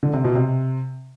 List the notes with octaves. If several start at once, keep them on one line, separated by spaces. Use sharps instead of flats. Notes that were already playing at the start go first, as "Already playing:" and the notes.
D3
C3
B2
C3